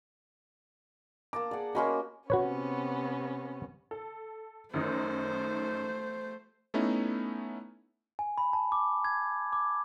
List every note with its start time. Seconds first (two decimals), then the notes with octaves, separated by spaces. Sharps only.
1.33 A#3 A5 A#5 D6
1.51 G#4 D5 F#5
1.75 A#3 C#4 F#4 D#5 B5 C6
2.30 C3 B3 C#4 F#4 B4 C#5
3.91 A4
4.74 F#2 D#3 A3 D#4 C5
6.74 A3 B3 C#4 D#4 E4
8.19 G#5
8.38 B5
8.53 A5
8.72 D6
9.04 G#6
9.53 D6